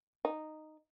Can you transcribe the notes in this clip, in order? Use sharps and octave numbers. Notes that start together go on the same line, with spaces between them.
D#4